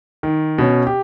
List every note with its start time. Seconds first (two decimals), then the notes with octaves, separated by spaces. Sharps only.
0.23 D#3
0.58 B2 C#4
0.87 G4